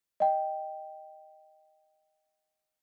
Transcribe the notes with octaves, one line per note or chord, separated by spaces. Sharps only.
D#5 G5